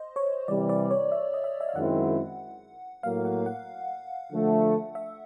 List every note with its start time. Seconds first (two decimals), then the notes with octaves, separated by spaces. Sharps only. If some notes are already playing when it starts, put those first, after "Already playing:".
Already playing: C5 D#5
0.16 C#5
0.48 C3 E3 G3 D5
0.69 D5
0.91 C#5
1.12 E5
1.34 D#5
1.44 E5
1.61 E5
1.69 F5
1.75 F#2 D#3 G#3 C4 E4 F#5
3.03 A2 F#3 A#3 F5
3.25 F#5
3.46 F#5
4.31 D3 F3 A3
4.95 E5